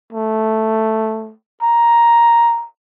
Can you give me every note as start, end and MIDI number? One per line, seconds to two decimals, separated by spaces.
0.13 1.34 57
1.62 2.66 82